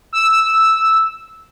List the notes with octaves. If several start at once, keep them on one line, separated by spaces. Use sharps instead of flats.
E6